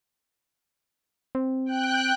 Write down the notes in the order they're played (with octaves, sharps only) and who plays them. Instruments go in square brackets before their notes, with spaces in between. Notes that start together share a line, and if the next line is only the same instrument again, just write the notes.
[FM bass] C4
[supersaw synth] G5 F#6